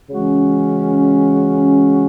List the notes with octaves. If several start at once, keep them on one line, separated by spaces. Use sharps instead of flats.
C#3 E3 G#3 C#4 F#4